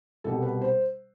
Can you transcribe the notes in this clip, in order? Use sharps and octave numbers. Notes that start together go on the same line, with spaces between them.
C2 B2 G3 A4
B4
C5